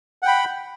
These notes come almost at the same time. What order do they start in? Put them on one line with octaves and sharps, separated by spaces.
F#5 G5 B5